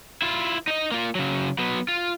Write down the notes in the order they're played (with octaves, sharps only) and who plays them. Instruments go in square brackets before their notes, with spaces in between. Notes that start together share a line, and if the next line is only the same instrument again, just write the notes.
[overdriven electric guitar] E4 F4
D#4 D#5
A#3 F4
C#3 F#3
F#3 B3
F4